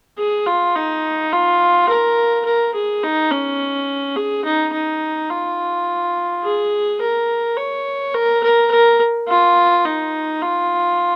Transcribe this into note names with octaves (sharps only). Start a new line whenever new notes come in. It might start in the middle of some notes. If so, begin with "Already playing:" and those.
G#4
F4
D#4
F4
A#4
A#4
G#4
D#4
C#4
G#4
D#4
D#4
F4
G#4
A#4
C#5
A#4
A#4
A#4
F4
D#4
F4